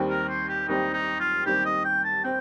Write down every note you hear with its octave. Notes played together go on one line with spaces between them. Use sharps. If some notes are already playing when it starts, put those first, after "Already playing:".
Already playing: D#2 D#3 G3 C4
A#4
C5
G4
D#2 D#3 G3 C4 D#4
D#4
F4
D#2 D#3 G3 C4 G4
D#5
G5
A5
C4 G5